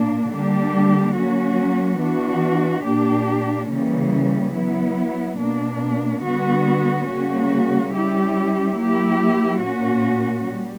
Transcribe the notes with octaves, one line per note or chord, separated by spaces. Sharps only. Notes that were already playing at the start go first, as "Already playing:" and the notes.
Already playing: A#2 A#3 D4
D3 G3 A#3 D4 G4
F#3 A#3 C#4 F#4
E3 B3 D4 F#4
A#2 A#3 D4 G4
C#3 E3 G3 A#3 C#4
F#3 B3 E4
B2 A#3 D4
D3 G3 B3 F#4
C#3 G3 A#3 C#4 F#4
G3 C#4 E4 G4
F#3 A#3 E4 G4
A#2 A#3 C#4 F#4
G3